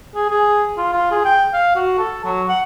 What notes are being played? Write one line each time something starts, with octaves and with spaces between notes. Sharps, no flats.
G#4
G#4
F4
F4
G#4
G5
F5
F#4
A4
F#3
F#5